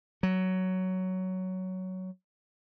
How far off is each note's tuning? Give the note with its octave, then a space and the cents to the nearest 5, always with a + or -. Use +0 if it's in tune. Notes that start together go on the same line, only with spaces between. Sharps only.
F#3 +10